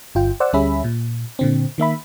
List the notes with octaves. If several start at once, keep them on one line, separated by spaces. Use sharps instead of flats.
G1 F4 G5
C5 D5 F#5 E6
D2 G3 C#4 G#4 E5 B5
A#2
A#2 D3 C4
D#3 A#3 E5 B5